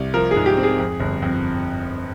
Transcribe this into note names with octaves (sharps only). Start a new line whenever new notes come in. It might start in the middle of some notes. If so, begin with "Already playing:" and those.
Already playing: C2
F3 A#4
G#4
G#2
G4
C4
G#4
F2
G1
F2